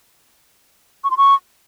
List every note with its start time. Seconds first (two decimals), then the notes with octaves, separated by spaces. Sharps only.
1.04 C#6
1.11 C6
1.17 C#6